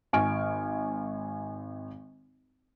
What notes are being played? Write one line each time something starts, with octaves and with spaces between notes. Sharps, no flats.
G#1 G#5 C#6 F6 D7